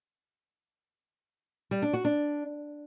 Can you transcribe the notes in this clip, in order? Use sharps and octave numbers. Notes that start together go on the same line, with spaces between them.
G3
D4
F#4
D4